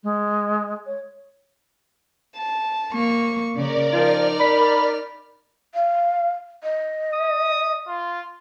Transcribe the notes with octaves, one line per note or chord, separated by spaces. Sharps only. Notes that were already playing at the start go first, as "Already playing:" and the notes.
G#3
C#5
A5
A#3 C#6
C#3 A#4 D5
F3 D#4 F4 F6
B5
F5
D#5
D#6
F4